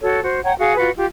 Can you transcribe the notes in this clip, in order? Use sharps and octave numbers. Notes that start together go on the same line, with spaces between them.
F#4 A4 C#5
F#4 C5
C#5 F#5 G5 A#5
F#4 G#4 F5
F4 F#4 B4
F4 G4